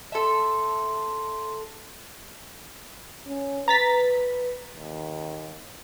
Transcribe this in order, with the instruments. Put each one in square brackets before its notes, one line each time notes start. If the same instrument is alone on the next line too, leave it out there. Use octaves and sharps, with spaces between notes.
[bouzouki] A4 E5 [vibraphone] A5 C6
[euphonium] C#4
[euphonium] B4 [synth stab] A#5 A6 B6
[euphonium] D#2